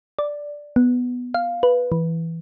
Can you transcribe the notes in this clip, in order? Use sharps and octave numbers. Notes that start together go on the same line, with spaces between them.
D5
B3
F5
B4
E3